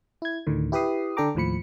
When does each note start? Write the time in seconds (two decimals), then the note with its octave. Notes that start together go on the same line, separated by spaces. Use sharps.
0.22 E4 G#6
0.47 D2 A2 D3 D#3
0.72 E4 G4 B4 B5 D#6 C7
1.17 D3 D4 A4 G5 A#5 D6
1.35 D#2 A2 F3 B5 C#7